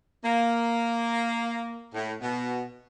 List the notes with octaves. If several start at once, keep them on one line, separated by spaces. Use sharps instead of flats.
A#3
A2
B2